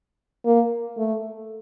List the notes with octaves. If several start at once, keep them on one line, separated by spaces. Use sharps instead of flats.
A#3
A3